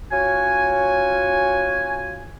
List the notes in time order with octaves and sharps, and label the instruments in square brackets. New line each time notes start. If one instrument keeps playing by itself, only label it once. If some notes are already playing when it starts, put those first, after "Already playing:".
[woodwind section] C#4 F4 F#4 C#5 G#5